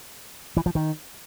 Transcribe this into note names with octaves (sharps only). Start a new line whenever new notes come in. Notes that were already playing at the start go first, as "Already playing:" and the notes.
E3
F3
D#3